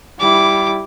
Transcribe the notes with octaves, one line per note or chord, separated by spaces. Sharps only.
G3 E4 D6